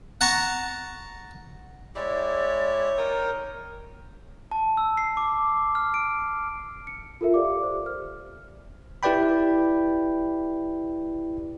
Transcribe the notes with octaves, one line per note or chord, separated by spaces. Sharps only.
F#5 A5 A#5 C#6
G#3 E4 G4 C#5 D5
D#4 A#4 G5 D#6
A5
E6
C7
D6
F6
D7
C#7
F4 A4 A#4 E5
G4 D5 F5 D6
C5
F6
E4 G4 B4 D5 G5 B5